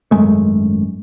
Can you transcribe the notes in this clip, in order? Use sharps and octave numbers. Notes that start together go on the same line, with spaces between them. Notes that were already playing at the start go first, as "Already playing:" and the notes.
G#1 F#2 G#3 A3